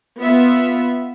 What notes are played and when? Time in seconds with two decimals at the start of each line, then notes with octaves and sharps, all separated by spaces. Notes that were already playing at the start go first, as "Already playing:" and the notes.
0.20 B3 F4 E5